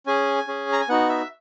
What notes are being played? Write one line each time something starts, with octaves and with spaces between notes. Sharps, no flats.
C#4 G#4 G#5
C#4 G#4
A#5
G#5
B3 D#4 F#4 F#5
E5